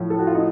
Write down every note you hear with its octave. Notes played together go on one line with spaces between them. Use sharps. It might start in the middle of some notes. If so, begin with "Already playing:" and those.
Already playing: A2 F3
A4
F#4
F4
D#4